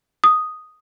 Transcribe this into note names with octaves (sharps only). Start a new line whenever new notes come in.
D#6